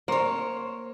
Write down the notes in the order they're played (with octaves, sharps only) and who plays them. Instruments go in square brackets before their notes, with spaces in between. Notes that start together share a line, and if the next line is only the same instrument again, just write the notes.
[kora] A#3 [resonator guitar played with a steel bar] C5 C#5